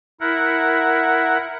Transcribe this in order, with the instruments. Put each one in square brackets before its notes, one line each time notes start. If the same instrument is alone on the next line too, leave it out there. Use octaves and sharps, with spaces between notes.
[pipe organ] E4 A#4 F#5